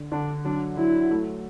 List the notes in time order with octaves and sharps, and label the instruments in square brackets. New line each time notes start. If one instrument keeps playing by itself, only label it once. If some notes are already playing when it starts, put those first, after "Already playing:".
Already playing: [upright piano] D3
[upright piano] D3 [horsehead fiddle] D4
[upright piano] F#3 [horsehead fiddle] D4
[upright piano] F#3 [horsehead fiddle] E4
[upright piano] A3